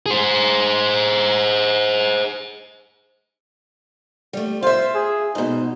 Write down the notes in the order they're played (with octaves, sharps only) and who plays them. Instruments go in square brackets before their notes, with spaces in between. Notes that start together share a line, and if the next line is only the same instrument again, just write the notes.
[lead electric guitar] G#4 C5
[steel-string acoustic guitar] G3 A3
[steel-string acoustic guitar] F4 E5 [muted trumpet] C5
[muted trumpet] G#4
[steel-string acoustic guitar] G#2 B2 [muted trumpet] D#4